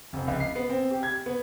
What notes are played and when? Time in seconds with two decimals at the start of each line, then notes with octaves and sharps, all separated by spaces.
0.13 F1
0.28 C#2
0.40 C7
0.55 B3
0.69 C4
0.91 G4
1.03 G#6
1.26 B3